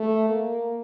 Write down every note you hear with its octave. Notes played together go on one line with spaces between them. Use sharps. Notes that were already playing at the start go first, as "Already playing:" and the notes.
Already playing: A3
A#3